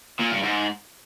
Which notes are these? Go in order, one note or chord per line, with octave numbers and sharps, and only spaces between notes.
A#2
G2
G#2